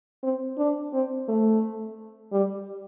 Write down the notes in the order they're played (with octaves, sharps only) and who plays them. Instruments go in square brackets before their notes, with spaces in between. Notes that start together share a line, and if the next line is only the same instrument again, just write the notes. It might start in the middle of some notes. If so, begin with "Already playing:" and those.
[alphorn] C4
D4
C4
A3
G3